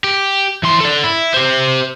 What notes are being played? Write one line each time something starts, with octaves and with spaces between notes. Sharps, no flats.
G4
E3 C6
A4 D5
E4
G4 C5